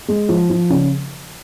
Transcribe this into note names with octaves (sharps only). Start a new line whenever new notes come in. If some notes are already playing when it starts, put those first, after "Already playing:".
G#3
F3
F3
C#3